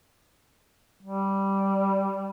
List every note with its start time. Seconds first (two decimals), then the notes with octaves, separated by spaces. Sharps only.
1.03 G3